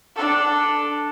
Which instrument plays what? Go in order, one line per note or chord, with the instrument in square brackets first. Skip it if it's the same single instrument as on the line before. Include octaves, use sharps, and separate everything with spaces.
[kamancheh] D4 A4